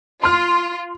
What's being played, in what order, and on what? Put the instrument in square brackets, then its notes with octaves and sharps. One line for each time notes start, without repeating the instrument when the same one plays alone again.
[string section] F4 [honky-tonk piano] C6 F6